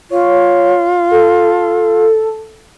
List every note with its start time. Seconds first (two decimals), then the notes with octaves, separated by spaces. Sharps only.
0.10 F4 C#5
1.11 A4